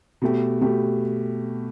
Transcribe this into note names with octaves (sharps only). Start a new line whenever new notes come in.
B2 A3 G4
B2 A3 G4